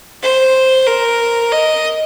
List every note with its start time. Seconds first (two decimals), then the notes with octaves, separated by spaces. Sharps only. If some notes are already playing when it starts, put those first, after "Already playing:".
0.22 C5
0.87 A#4
1.52 D#5